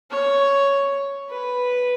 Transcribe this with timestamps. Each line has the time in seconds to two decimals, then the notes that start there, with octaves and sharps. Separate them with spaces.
0.11 C#5
1.30 B4